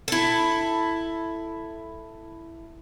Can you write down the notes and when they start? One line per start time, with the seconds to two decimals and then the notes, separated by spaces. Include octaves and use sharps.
0.08 E4 A4